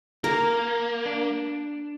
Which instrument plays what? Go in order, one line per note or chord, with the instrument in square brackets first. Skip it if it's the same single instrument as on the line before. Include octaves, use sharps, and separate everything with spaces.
[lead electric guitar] A#3 [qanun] A#4
[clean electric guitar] D4